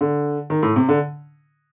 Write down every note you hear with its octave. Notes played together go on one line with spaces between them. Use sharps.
D3
D#3
A2
C3
D3